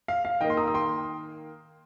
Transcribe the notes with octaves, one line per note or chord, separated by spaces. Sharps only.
F5
F5
D#3 A#3 D#5 G5
C6
A#5 D#6
D#6
G5 C6